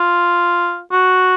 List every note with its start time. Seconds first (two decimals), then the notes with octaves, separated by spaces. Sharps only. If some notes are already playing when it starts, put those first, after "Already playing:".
Already playing: F4
0.92 F#4